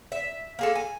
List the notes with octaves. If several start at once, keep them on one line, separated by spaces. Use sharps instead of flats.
E5
A#3 G#4 A4
G#5